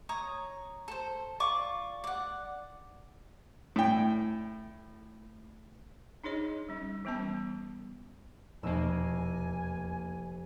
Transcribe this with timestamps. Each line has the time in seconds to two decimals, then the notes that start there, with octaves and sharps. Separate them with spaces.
0.09 C#5 A#5 D#6
0.88 A4 C5
1.40 F4 D5 C#6 D6
2.04 D5 F#5
3.76 A2 G5
6.24 D4 D#4 G#4 C#5 D#5
6.69 G3 C#4
7.05 E3 G3 B3 C#4 A5
8.63 F1 E2 B2 A#3 G#5 E6 D#7